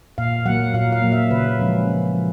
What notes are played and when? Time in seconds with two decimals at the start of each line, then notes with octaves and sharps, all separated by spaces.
0.18 A#2 F5
0.46 F#3 A#3 F#5
0.74 A#2 F5
0.92 F5
1.02 F#3 A#3
1.12 E5
1.31 C#3 B4
1.59 F3 G#3 C#4
1.88 C#3
2.16 F3